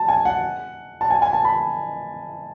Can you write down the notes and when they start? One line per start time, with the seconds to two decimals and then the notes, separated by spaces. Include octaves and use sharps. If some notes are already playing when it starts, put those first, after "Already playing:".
Already playing: A5
0.08 G#5
0.25 F#5
1.01 A5
1.10 G#5
1.22 G#5
1.33 A5
1.45 B5